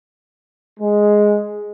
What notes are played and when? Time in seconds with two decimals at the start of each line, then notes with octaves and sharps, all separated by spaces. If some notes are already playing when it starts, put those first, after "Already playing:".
0.80 G#3